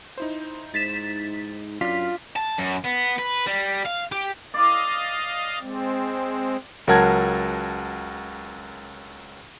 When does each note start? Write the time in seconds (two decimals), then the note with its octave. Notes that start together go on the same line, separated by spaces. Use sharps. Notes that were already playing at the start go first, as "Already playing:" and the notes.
0.18 D#4 E4 C5
0.74 G#2 A6 B6 E7
1.81 F#2 D4 F4 D5 F6 B6
2.36 A5
2.58 F#2
2.84 B3
3.18 B4
3.47 G3
3.86 F5
4.12 G4
4.54 D5 D#5 F5
5.61 G#3 C4
6.87 C#2 F#3 A#4 F#5 A5 G#6